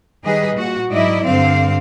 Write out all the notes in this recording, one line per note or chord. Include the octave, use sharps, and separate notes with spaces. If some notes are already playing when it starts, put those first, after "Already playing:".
D#3 G3 G#4 B4 D#5
A#2 F#4
G#2 F#3 E4 D5 D#5
G2 D3 C4 F5